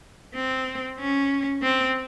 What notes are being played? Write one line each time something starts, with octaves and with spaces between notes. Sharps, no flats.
C4
C#4
C4